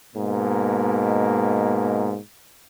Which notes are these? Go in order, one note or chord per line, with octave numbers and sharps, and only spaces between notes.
G#2 B2 A#3